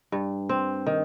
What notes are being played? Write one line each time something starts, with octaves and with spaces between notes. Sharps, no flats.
G2
C4
D#3